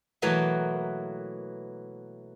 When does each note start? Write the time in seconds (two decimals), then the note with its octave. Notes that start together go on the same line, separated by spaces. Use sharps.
0.22 B2 E3 F#3 A3 A#3